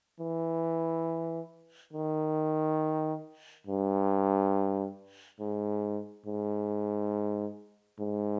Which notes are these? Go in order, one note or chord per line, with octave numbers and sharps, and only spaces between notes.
E3
D#3
G2
G#2
G#2
G#2